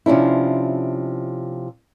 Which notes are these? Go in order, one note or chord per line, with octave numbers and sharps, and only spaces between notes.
C3 F3 C#4 D4 E4